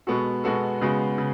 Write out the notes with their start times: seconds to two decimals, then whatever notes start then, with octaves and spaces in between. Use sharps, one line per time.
0.07 B2 G#3 B3 F#4 A4
0.44 B2 G#3 B3 F#4 A4
0.81 C#3 G#3 B3 F#4
1.18 C#3